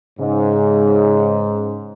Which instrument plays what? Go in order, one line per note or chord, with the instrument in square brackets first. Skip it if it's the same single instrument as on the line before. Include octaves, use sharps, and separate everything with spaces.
[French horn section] G#2 [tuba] C#3